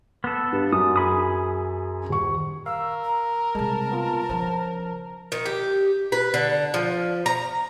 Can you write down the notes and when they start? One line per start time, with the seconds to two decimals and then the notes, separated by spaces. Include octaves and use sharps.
0.24 B3 A4
0.52 G2
0.73 F#2 D#6
0.96 G#4 B5 D#6
2.09 D#1 C#6
2.66 A#4 F5 E6
3.03 A#5
3.55 C3 G3 G#3 A5
3.91 B3 F4
4.29 C#3 F3 C5
5.32 D#3
5.46 G4
6.12 B4
6.34 D3
6.74 F3
7.26 A#5